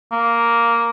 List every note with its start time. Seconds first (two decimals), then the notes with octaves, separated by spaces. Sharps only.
0.12 A#3